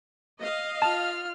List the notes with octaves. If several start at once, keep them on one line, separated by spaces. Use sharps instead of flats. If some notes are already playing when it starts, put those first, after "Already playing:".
D#5 F5
F4 A5 F6